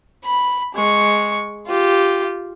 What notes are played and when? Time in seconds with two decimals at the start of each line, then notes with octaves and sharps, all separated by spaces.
0.25 B5
0.75 G#3 C#6
1.67 F4 G4